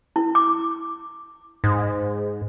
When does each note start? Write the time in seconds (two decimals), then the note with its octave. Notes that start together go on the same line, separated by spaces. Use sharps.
0.16 E4
0.35 D6
1.64 G#2